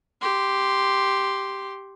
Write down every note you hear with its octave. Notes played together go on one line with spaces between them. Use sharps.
G4 C6